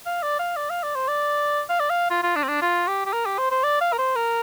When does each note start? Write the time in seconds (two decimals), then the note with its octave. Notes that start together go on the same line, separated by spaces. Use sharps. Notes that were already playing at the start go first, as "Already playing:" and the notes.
0.06 F5
0.22 D5
0.39 F5
0.56 D5
0.70 F5
0.83 D5
0.95 C5
1.08 D5
1.69 F5
1.79 D5
1.90 F5
2.10 F4
2.23 F4
2.36 D4
2.43 C4
2.48 D4
2.62 F4
2.88 G4
3.06 G4
3.13 A#4
3.26 G4
3.38 C5
3.51 C5
3.63 D5
3.81 F5
3.93 A#4
3.98 C5
4.16 A#4